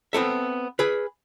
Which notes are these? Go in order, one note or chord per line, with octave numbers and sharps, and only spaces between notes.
B3 C4 A4 E5
G#4 B4